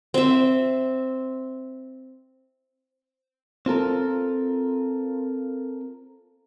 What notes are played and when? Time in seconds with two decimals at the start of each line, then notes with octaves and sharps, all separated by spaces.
0.14 C4 E5
3.66 C4 F4 A4 A#4